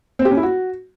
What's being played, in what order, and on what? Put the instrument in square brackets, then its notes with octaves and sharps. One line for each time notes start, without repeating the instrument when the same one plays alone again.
[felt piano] C4
G4
C#4
E4
F#4